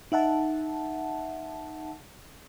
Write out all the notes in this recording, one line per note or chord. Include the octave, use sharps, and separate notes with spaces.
D#4 E5 F#5 A5